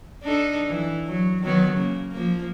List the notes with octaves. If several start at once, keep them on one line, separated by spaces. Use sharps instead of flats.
D4 D#4 A4
E3
F#3
D#3 F#3 B3
C#3 A#3
F3 A#3